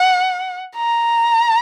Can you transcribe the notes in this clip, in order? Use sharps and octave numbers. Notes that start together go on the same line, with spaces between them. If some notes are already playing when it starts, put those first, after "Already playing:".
Already playing: F#5
A#5